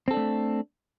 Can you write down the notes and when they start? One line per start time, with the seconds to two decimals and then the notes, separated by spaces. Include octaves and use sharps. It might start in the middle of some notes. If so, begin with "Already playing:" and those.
0.08 C4
0.11 A4
0.14 D4
0.17 A3